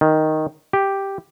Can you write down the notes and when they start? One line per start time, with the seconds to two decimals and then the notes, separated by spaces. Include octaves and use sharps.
0.01 D#3
0.73 G4